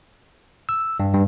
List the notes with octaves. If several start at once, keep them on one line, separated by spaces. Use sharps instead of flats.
E6
G2
G2